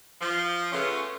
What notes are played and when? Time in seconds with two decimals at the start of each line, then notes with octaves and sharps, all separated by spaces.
0.21 F3
0.72 C#3 A3 B3 C#4 F4